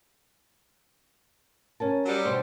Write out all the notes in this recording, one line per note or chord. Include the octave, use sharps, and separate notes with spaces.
C#4 A#4 A5
F#3 G3
B2 D3 C5